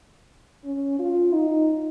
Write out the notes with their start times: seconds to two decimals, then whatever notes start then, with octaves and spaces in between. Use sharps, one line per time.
0.65 C#4
0.99 F4
1.33 D#4